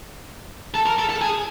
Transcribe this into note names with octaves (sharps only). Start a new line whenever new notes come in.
A4
A#4
A4
A4
G#4